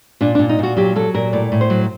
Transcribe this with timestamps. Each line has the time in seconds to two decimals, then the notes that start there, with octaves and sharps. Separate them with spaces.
0.21 A#2 D4
0.35 A#2 D4
0.49 D#4
0.59 A#2 F#4
0.77 F#3 G4
0.96 F#3 A4
1.14 A#2 A#4
1.33 A2 D5
1.52 A2
1.61 C5
1.70 F#3